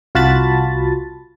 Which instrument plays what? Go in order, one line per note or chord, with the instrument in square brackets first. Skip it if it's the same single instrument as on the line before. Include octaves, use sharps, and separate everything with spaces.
[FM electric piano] C2 F4 F#4 A5 B5 A6